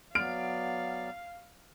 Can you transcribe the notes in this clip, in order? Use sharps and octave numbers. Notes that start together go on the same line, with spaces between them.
F#3 B3 D5 F5 F6 D7